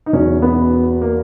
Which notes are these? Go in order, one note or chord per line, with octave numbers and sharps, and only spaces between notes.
D#4
E2 B2 C#4
B3
A#3